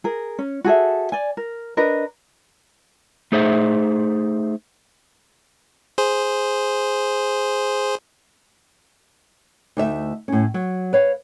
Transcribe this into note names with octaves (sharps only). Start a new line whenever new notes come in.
G#4 A#4
C#4
F#4 G#4 A4 E5
D5 G#5
A#4
D4 A#4 B4 D#5
A3 D#4 G#4 C5 E5
G#4 C5
D2 D#4 E5
A2 C#4
F#3
B4 C#5 F5